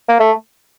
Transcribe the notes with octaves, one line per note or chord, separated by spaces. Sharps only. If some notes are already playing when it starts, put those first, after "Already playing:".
A#3
A3